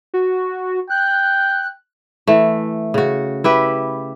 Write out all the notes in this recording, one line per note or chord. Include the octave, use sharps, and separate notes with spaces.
F#4
G5 F#6
E3 A3
C#3 F#4
E4 G4 B4